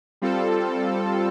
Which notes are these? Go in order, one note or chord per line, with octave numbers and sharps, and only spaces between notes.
G3 C4 F4 A4